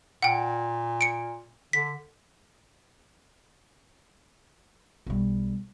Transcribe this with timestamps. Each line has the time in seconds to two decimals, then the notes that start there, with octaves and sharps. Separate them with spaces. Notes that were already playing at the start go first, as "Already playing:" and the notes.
0.22 A#2 F#5 G5
1.01 C#7 D7
1.73 D3 B6
5.07 B1 G3